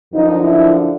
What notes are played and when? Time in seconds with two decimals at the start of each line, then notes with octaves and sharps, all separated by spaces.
0.13 F#2 D3 F3 D#4
0.43 E4